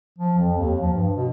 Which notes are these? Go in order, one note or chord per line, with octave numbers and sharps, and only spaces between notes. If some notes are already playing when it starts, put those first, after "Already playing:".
F3
F2
D#2
F3
G2
B2